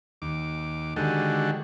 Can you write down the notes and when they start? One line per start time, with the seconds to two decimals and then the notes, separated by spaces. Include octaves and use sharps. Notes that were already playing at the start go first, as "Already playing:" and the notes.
0.22 D#2 D6
0.96 D3 D#3 G#3 F#4 G4 A4